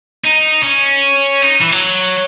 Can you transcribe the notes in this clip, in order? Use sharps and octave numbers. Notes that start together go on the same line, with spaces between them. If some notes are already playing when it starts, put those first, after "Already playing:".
D#4
C#4
D#4
E3
F#3